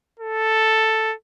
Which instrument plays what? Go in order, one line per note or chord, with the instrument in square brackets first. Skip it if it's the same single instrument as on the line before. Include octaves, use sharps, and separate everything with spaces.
[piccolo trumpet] A4